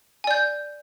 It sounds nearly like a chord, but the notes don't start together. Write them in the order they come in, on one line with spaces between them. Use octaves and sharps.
G#5 D5 G6